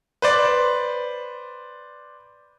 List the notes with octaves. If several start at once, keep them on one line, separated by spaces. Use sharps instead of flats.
B4 C5 D5